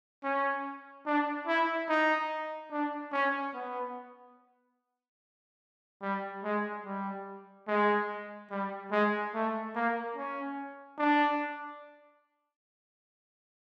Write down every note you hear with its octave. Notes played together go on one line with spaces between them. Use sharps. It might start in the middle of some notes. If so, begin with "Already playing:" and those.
C#4
D4
E4
D#4
D4
C#4
B3
G3
G#3
G3
G#3
G3
G#3
A3
A#3
C#4
D4